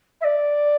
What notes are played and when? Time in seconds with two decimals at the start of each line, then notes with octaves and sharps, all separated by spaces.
0.21 E5
0.24 D5